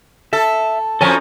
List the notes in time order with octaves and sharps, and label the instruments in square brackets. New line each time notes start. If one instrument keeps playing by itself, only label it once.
[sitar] A4 [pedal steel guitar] E5
[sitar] F2 F3 C#4 [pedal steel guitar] A4 G#5 A#5